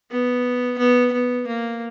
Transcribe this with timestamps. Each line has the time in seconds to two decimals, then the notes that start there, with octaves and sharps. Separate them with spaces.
0.11 B3
0.78 B3
1.12 B3
1.47 A#3